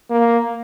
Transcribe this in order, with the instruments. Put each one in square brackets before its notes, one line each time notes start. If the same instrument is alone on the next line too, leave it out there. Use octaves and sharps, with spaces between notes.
[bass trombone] A#3